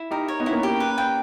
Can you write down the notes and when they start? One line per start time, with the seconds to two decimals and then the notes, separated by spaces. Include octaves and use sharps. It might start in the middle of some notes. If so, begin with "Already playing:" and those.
Already playing: E4
0.11 D#4 G4 A#4
0.28 C#5
0.40 B3 D#4
0.46 E4
0.51 A#3 C#4
0.63 G4
0.80 B4
0.98 G5